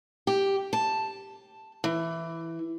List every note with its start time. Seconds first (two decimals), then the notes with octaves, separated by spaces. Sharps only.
0.27 G4
0.73 A5
1.84 E3